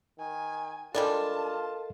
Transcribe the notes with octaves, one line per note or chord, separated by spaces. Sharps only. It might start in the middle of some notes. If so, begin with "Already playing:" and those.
D#3 G#5
G3 G#3 D4 F4 A4 A#4 D#5 A5